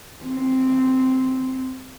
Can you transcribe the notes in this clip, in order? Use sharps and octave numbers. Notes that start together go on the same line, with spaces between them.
C4